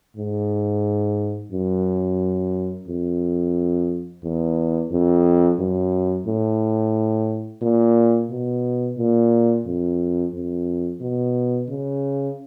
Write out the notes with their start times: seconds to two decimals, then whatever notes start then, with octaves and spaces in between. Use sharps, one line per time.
0.17 G#2
1.52 F#2
2.88 F2
4.23 E2
4.91 F2
5.59 F#2
6.27 A2
7.62 A#2
8.30 B2
8.98 A#2
9.66 F2
10.34 F2
11.01 B2
11.69 C#3